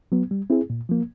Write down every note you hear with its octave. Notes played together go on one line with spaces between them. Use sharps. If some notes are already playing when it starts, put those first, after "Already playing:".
F#3 B3
G3
C4 E4 G#4
A#2
F3 A#3